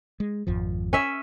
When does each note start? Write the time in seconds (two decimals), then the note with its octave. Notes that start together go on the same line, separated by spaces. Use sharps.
0.20 G#3
0.47 G#1 F2 F3
0.93 C#4 E5